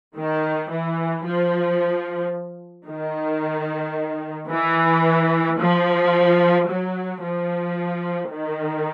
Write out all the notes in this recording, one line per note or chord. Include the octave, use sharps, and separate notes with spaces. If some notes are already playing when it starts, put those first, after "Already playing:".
D#3
E3
F3
D#3
E3
F3
F#3
F3
D#3